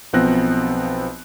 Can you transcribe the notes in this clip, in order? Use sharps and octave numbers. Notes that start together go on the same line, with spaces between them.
B1 F3 B3 C4 F#6 A#6